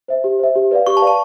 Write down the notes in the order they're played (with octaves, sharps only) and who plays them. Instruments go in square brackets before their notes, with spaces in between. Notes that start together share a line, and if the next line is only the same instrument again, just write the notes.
[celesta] C5 E5
G4
C5 E5
G4
B4 D5 F5
[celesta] G4 [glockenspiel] C#6
[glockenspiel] A5
[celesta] B4 D5 F5
[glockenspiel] A5